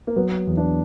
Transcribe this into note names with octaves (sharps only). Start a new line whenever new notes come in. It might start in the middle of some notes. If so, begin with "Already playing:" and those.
A#3
F#3 B3
E2
D4